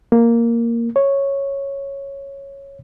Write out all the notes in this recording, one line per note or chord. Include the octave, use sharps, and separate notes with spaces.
A#3
C#5